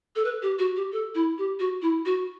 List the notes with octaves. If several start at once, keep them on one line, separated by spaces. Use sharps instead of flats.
A4
B4
G4
F#4
G4
A4
E4
G4
F#4
E4
F#4